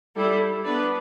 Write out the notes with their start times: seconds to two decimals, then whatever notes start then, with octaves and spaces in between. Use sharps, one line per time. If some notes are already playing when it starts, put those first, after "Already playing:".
0.16 G3 E4 A4
0.64 B3 D4 B4 D5